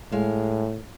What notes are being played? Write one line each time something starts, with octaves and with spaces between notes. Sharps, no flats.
A2 G#3 F5